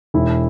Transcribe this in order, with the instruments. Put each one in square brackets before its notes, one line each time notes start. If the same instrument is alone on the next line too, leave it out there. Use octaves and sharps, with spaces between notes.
[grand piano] E1 E4